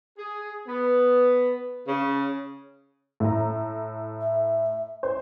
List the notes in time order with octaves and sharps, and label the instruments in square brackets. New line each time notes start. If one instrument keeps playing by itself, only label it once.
[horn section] G#4
B3
C#3
[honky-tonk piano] A2 A#5
[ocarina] E5
[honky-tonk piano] C5